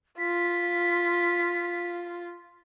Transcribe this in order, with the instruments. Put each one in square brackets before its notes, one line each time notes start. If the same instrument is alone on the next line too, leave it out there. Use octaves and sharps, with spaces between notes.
[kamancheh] F4 [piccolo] B6